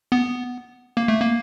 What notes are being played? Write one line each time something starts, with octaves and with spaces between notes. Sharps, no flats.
B3
A#3
A3
A#3